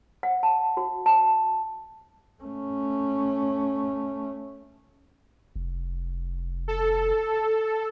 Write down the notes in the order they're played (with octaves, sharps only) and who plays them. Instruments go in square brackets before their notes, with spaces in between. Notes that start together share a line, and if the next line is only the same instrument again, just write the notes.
[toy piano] F#5
A5
F#4
A5
[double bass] A3 C#4
[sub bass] F1
[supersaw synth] A4